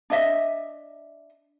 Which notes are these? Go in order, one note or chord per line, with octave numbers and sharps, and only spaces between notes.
D4 D#5 E5